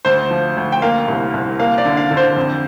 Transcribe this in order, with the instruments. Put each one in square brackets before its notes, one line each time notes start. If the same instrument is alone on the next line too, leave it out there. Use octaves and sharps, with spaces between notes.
[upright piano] D2 C5
F3
D2
G5
A#3 F5
C2
C2
A#3 F5
D5
D3
F5
D3
C5
F2